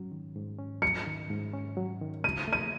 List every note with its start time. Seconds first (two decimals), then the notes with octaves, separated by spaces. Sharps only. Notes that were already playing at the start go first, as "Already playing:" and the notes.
Already playing: G#2 F#3 C#4
0.12 D#3
0.36 G#2
0.58 C#4
0.82 F#3 C#7
1.06 D#3
1.30 G#2
1.53 C#4
1.77 F#3
2.01 D#3
2.24 C#2 D#7
2.48 A3 D#7